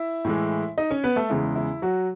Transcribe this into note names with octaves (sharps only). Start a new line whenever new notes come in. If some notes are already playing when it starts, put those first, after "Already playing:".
Already playing: E4 E5
A2 E3 G#3
D#4 D#5
C#4 C#5
B3 B4
A3 A4
E2 C#3 G#3 E4
E4
F#3 F#4